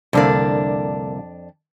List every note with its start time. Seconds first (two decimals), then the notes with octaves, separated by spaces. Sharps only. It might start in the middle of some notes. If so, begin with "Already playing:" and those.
0.13 C2 F2 D3 A#3 D4 D5